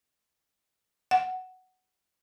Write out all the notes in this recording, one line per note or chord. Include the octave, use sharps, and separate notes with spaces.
F#5